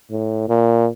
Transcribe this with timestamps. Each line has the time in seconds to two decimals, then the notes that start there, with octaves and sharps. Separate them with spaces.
0.11 A2
0.49 A#2